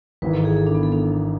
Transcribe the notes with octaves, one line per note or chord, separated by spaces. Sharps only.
G#1 G#2 E3 B4
A4
G#4
A4
D4
B3
A4
D4